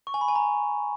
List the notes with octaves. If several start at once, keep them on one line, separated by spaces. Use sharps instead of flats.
C#6
G#5
B5
G#5
A#5